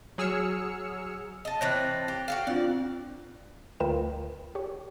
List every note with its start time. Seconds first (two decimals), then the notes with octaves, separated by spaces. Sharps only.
0.18 F#3 G#4 E6 F6 C#7
1.45 D#5 A5
1.61 E3 C4 C#5 F#6 A6 A#6
2.08 G4
2.28 F#4 G4 F5
2.47 C4 D4 F4 D5
3.80 D2 F4 A#4 B4 G5 E7
4.55 G4 C#5